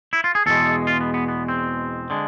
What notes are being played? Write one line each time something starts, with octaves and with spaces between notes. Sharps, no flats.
E4
F4
G#4
E2 B2 G#3 A4
F4
B3
B3
B3
C4
D3 G#3